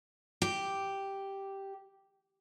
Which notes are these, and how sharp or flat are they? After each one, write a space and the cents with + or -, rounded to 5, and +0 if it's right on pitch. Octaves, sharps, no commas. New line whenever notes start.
G4 -5